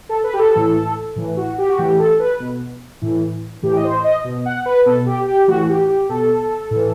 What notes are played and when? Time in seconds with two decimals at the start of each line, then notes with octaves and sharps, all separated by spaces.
0.09 A4
0.24 B4
0.33 G4
0.39 A4
0.55 A2 E3
1.16 A2 E3
1.37 F#4
1.58 G4
1.69 F#4
1.78 A2 E3 G4
1.99 A4
2.20 B4
2.40 B2
3.02 A2 E3
3.62 A2 E3 G4
3.76 D#5
3.84 C5
4.04 D#5
4.24 B2
4.46 F#5
4.66 B4
4.86 B2 A4
5.07 G4
5.28 G4
5.48 A2 E3 F#4
5.69 G4
5.89 G4
6.09 B2 A4
6.71 A2 E3